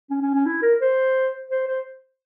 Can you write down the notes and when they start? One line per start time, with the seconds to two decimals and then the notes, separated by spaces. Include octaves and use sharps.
0.10 C#4
0.22 C#4
0.34 C#4
0.46 E4
0.62 A#4
0.81 C5
1.50 C5
1.67 C5